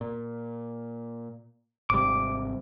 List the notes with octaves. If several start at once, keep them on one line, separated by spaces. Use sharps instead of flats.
A#2
G#1 C3 G3 D6